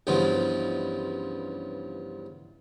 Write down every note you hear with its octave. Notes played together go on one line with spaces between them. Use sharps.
C#2 G2 C#3 E3 F3 B3